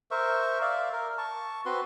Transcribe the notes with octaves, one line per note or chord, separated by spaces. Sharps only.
A#4 C5 E5 C#6
D5 E5 F5
A#4
A5 C#6
C4 F#4 B4 C6